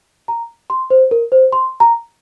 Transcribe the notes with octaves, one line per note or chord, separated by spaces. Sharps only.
A#5
C6
C5
A#4
C5
C6
A#5